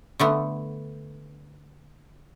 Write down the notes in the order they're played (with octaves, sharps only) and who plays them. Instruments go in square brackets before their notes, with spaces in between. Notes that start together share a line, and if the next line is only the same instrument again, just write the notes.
[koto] D3 A3 B3